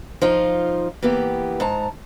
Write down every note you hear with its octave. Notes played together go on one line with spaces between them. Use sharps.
F3 D#4 F4
E3 A#3 B3 G4
G#2 A5 A#5